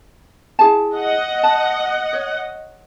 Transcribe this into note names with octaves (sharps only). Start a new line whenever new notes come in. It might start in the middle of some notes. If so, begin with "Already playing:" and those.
E4 G#4 A5
D#5 F#5
A5
C#5